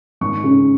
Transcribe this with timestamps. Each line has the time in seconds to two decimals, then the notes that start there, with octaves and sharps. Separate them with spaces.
0.21 G#1 C#6
0.44 C#3